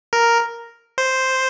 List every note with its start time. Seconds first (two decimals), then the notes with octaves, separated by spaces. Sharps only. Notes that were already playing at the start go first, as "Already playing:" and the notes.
0.13 A#4
0.98 C5